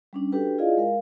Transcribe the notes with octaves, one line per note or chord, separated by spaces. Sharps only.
G3 C#4 D4
D4 F#4 G4 A4 B4 G5
E4 F4 G#4 D5 D#5 F5
G#3 A#4 F5